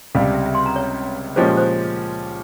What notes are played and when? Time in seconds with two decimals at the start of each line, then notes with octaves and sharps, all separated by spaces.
0.15 C#2 C3 G3 F5
0.35 E5
0.46 E5
0.55 C6
0.66 A#5
0.76 C#5
1.36 A#2 F3 G#3 C#4 G4 C5
1.47 C#5
1.57 C5